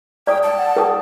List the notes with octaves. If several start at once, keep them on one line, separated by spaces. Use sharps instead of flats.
D5 G5 D#6
A5
F#5
A#4 G5 D#6